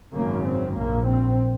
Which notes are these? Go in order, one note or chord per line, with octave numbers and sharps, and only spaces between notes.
G#1 F#2 C#3 A#3
C4
A#1 A#2 A#3
C4